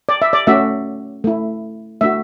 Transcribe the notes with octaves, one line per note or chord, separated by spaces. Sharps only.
D5
E5
D5
A3 C#4 F#4 E5
A3 E4
A3 D4 F#4 E5